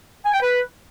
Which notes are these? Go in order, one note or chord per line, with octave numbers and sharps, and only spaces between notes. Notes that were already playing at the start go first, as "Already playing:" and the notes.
G#5
G5
B4